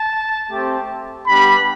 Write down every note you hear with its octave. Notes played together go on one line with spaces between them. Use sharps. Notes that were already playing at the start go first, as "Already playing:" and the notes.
Already playing: A5
A3 C4 G4
G3 B3 D4 G4 B5